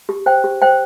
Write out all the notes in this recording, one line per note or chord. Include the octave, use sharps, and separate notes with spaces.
G4
C5 G5
G4
C5 G5